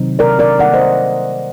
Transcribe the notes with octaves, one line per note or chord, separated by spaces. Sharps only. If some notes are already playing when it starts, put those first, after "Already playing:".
Already playing: C3 D#3 F#3 C4 D#4
A#4 D5
A#4 D5
D#3 G3 A#3 D#4 D5 F#5
C5 D#5